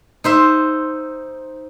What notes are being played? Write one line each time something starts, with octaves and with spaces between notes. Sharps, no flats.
D#4 C5 E5